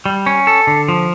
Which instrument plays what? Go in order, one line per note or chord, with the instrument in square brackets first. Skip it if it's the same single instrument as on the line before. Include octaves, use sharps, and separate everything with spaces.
[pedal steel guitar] G3
C#4
A4
D3
F3